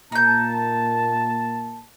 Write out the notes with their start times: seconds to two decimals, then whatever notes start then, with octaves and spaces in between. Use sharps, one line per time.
0.12 A#2 A#3 D#4 A5 G6